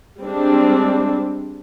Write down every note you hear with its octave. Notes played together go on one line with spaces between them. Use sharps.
G3 G#3 C4 D4